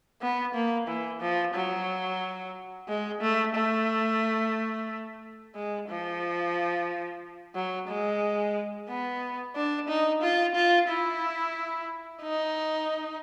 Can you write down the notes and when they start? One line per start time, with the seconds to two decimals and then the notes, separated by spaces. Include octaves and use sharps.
0.22 B3
0.54 A#3
0.88 E3
1.21 F3
1.54 F#3
2.88 G#3
3.21 A3
3.55 A3
5.55 G#3
5.89 F3
7.55 F#3
7.88 G#3
8.89 B3
9.56 D4
9.88 D#4
10.22 F4
10.55 F4
10.89 E4
12.22 D#4